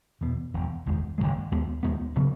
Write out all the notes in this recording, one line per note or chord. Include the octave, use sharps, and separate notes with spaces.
E1 E2 B2
E1 E2 B2
F#1 E2 D#3 G#3
F#1 E2 D#3 G#3
D#2 D#3 G#3 B3
D#2 D#3 G#3 B3
C#3 F#3 B3